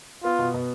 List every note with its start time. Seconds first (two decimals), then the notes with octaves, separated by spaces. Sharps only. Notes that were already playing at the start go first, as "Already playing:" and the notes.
0.23 B3 F4
0.39 B2
0.54 B2